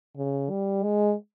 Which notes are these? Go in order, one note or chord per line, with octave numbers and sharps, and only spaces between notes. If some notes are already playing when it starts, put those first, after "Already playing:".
C#3
G3
G#3